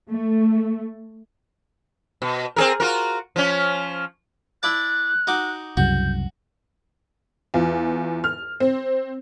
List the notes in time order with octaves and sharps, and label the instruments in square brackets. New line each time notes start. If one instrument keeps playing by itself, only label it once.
[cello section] A3
[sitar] B2
C4 G#4 A#4
F4 F#4 A#4
F3 C#4
[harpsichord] E4 D5 A5 [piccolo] F#6
[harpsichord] D#4 F#4 D6
[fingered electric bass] C2 F#2 C#3 [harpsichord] F#4 [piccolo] G6
[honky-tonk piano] E2 F4
F6
C4